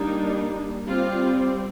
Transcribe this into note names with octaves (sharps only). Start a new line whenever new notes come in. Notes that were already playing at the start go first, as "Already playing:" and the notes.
Already playing: G3 A#3 D4 D#4
G3 C4 F4